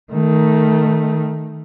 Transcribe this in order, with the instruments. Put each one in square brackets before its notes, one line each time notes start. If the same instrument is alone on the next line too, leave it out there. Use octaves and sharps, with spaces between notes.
[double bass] D#3 A3